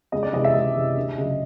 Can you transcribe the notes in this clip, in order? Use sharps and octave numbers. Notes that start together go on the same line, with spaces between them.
C#2 D#5
D5
C3 E3 G#3 D#5
E5
C#2 D#5
C3 E3 G#3
D2
C#3 F#3